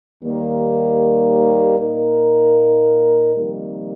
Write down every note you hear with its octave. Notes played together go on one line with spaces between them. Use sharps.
D#2 D#3 G3 A#3
A#2 A#3 D#4 A#4
F2 C3 D#3 G3 A#3